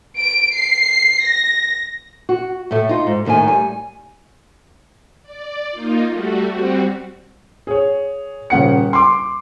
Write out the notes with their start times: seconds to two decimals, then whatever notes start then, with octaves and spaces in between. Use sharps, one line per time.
0.17 D7
0.55 C7
1.23 A#6
2.29 F#4
2.71 A2 A3
2.89 D#4 F4
3.07 G#2
3.25 D#2 A2 D#3 A3 G#5
3.48 G3 G#5
5.23 D5
5.72 A#3 D#4 F4
6.08 G3 A3 F#4
6.49 G3 C4 F#4
7.67 G#4 C#5
8.50 D#1 C#3 F#5 C#7
8.93 C6 D6